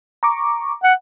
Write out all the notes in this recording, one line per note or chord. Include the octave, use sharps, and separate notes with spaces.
A#5 C#6 D6
F#5